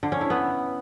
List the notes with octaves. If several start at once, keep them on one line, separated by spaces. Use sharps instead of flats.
D3
C#4
E4
B3